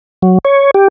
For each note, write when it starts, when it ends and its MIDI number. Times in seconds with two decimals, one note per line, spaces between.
0.22 0.38 54
0.45 0.71 73
0.74 0.88 67